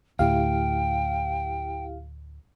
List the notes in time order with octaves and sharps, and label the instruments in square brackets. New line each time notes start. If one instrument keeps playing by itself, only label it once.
[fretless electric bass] D2 A2 [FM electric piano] E4 G4 F5 [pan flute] G5